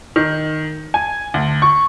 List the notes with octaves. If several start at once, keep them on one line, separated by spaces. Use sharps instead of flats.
D#3
G#5
D2
C#6